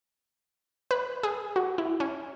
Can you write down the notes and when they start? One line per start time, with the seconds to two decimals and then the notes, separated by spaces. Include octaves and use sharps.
0.91 B4
1.23 G#4
1.56 F#4
1.78 E4
2.00 C#4